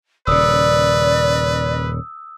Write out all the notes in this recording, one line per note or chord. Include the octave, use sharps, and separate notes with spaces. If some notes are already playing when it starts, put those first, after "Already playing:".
D#1 C#3 B4 D5 D#6 E6